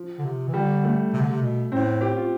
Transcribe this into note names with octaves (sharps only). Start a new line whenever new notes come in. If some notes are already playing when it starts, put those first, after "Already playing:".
Already playing: F3
D3
C3
E3
D3 G3
A3
C3
D3
C3
B2
A2 C4
G4
F4